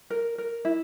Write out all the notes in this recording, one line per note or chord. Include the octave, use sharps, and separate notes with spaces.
A#4
A#4
E4